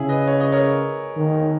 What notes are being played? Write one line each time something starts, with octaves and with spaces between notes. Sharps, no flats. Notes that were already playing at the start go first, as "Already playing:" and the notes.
Already playing: C#3 E4 G#4
B4 D#5
C#5
D#5
A#4 C#5
D#3